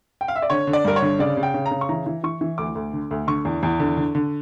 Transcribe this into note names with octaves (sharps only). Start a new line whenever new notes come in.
G5
F5
E5
D5
D3 C#5
D3
D5
G2 A#4
C#5
D3
C#3 D5
C#3
G5
C#3
A#5
C#3
C#6
E3 A#5
E3
E3 C#6
E3
D2 D6
D2
D3
D2
D3 C#6
E2
E2
D3
D3
D3